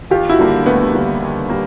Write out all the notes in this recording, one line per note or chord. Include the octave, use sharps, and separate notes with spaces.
D#2 F4 G4
E4 F#4
D3 G3 A#3
D#2 A3 B3
D3 G3 A#3
D#2
G3 A#3